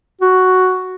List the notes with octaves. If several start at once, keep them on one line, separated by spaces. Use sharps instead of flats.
F#4